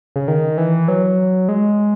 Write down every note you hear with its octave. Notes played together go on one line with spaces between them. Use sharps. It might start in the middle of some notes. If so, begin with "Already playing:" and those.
C#3
D#3
E3
F#3
G#3